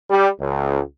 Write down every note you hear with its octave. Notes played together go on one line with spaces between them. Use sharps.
G3
C#2